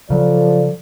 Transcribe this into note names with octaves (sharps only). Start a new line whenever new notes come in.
C#3 F3 F#3 A4 D5